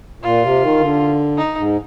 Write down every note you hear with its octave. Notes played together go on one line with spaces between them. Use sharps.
A#2 F4
C3
D#3
D3
D#4
G#2